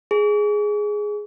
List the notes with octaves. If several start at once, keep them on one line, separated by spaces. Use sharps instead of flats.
G#4